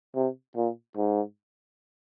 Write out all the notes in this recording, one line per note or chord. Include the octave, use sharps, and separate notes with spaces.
C3
A#2
G#2